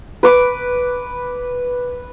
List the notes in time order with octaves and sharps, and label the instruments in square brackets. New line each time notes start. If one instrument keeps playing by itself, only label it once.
[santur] B4 D6